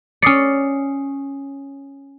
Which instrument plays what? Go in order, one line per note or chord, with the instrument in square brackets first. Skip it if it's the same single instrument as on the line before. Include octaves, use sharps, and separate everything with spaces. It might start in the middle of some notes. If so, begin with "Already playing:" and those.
[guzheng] C#4 D5 [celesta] D#6 C7 C#7